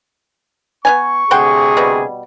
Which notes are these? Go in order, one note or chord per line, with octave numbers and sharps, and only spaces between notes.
B3 C#4 G#5 C#6
D2 C3 G#4 F#5 G5 C6
B2 G3